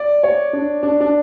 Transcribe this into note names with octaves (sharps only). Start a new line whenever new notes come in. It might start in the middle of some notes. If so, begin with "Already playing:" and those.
Already playing: D5
C#5
D4
D4
D4